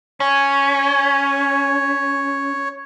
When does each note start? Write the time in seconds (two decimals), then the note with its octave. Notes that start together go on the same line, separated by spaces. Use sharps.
0.20 C#4 C#5